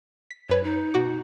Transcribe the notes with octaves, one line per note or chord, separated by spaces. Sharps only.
B6
F#2 B4 C#5
D#4
B2 F#4 D6